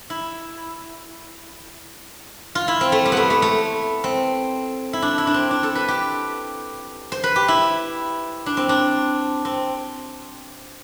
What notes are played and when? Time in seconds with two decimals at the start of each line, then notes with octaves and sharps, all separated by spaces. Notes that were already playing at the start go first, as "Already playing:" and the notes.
0.10 E4
2.55 F4
2.68 E4
2.81 C4
2.92 A3
3.05 G3
3.12 A3 B3
3.30 A3
3.42 A3
4.04 C4
4.93 E4
5.02 D4
5.18 E4
5.27 D4
5.34 C4
5.51 D4
5.63 A4
5.75 B4
5.88 G4
7.12 C5
7.24 B4
7.36 G4
7.48 E4
8.46 D4
8.57 C4
8.69 D4
9.45 C4